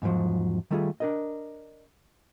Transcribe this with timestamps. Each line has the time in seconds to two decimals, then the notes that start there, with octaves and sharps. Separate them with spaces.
0.02 E2 G#2 C#3 F3 F#3
0.71 D#3 G3 A3 F4 G4 G#4
1.00 D4 A#4 D#5